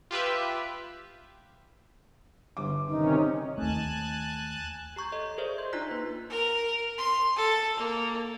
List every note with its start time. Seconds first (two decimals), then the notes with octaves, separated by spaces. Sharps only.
0.11 F4 G4 B4 E5
2.57 G1 D6
2.89 C3 D#3 C#4 D#4
3.58 D#2 A3 G#5 A5 F#6
4.96 G4 A#5 C#6 G6 G#6
5.12 A4 C#5 D#5
5.38 G#4 A#4 C5 D5 E5
5.58 C6 G6 G#6
5.73 D4 D#4 F4 A#5 F#6 B6
5.91 A#3 B4
6.30 A#4
6.98 C6
7.36 A4
7.76 A#3